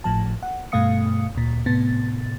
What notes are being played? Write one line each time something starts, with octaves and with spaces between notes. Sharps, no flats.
G#1 A2 F3 A5
F#5
G2 B2 A3 F5 D#6 C#7
D2 A#2
A2 C3 B3 A6